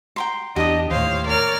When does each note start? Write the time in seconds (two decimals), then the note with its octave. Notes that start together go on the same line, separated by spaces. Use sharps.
0.16 G5 A#5 C6
0.56 E2 D4 G4 D#5 D#6
0.91 D#2 A2 C5 C#5 F5
1.27 A#4 C#5 D5 F6